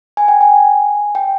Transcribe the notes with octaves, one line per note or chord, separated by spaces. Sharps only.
G#5
G5
G#5
G5